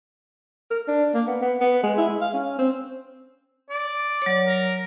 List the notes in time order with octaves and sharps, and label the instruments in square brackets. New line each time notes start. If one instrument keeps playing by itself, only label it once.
[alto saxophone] A#4
D4
A#3
B3
B3
B3
G#3
E4
G#3
F5
C#4
C4
[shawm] D5
[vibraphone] F#3 C#5
[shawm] A#4